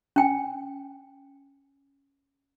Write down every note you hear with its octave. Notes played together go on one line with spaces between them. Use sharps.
C#4 G5 G#5